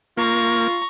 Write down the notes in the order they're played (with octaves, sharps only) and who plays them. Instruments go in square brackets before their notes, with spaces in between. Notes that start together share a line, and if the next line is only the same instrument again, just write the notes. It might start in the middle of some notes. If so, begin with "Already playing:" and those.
[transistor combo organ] A#3 [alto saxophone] F4 [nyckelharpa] A#5 C#6